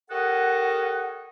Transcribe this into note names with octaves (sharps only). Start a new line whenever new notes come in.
G4 A4 A#4 C#5 D#5 F#5